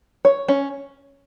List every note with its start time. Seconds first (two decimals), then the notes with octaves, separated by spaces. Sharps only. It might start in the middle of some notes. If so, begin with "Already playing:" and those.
0.25 C#5
0.48 C#4